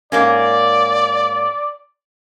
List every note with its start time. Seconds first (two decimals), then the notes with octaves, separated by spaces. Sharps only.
0.12 G#2 A#3 C#4 D5